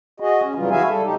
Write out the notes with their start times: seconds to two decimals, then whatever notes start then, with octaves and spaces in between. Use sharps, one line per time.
0.20 F#4 G#4 D#5
0.42 C#4
0.55 F2 C#3 E3 F#3 G3 F4
0.71 E4 F#4 G#4 E5 F5 G#5
0.87 G3 A4
1.03 C3 F#3 G#3 D#4 G4